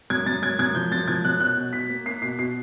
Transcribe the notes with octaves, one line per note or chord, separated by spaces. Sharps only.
F#2 G#6
F#2 A6
F#2 G#6
F#2 G#6
F3 G6
F#2 A6
F3 G#6
F#2 F#6
B2 F#6
B2
F#3 B6
A#3
A#3 C7
B2 C7
B2 C7